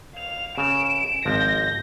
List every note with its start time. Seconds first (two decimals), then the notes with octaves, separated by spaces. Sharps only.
0.14 F5 F7
0.58 C#3 D7 E7
1.25 G#1 F3 G6 A#6